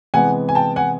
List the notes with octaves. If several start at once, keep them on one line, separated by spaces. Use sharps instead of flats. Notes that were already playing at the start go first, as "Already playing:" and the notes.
C3 E3 G#3 B3 F#5 G#5
G#5
G5 A5
F#5 G#5